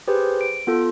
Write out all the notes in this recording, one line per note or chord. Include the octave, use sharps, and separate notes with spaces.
G4 G#4 B4 C5
D7
B3 F4 A4